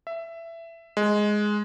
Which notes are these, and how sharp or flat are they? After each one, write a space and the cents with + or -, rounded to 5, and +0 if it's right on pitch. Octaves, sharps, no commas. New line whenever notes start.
E5 +15
G#3 +5